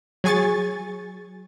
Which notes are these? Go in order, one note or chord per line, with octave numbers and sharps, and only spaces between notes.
F#3 G#4 G#5 C#6 A6